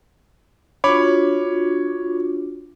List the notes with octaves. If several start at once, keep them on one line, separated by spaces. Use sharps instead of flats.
D4 F4 F#4 C#5 B5 D6